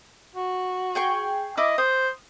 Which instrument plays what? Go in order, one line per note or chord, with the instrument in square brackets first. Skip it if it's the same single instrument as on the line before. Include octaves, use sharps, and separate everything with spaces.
[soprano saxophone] F#4
[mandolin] G#4 G5 C#6
[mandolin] E4 D6 [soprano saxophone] D#5
[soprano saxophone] C5 [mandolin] D#6